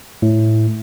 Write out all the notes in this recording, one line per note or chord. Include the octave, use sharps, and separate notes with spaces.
A2